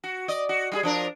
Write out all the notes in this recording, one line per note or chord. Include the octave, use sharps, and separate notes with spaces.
F#4
D5 D#5
F#4
G3 F4 G#4
F3 D4 A#4